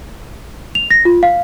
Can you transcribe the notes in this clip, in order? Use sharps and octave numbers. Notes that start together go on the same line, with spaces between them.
F7
A#6
F4
F5